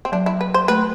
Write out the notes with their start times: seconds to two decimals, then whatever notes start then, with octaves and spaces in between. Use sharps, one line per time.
0.05 C4
0.12 F#3 D4
0.26 E4
0.41 B4
0.54 C5
0.68 A3 B4